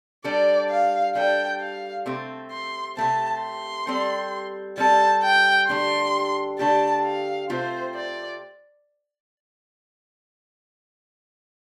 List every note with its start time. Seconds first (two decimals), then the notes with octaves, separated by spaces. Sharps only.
0.24 G3 D4 A4 D5
0.70 F5
1.15 G3 D4 A4 G5
1.61 F5
2.06 C3 A3 C4
2.51 C6
2.97 C3 A3 C4 A5
3.42 C6
3.87 G3 C4 A4
4.78 G3 C4 A4 A5
5.23 G5
5.69 D3 A3 D4 G4 C6
6.59 D3 A3 D4 G4 A5
7.05 F5
7.50 C3 A3 C4 F4 C5
7.95 D5